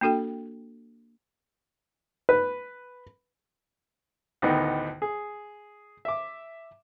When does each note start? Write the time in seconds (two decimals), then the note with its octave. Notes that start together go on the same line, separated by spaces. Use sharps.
0.01 A#3 D4 F#4 A4 G5
2.29 B4
4.42 D2 A2 D#3 B3 D#4
5.02 G#4
6.05 E5 D6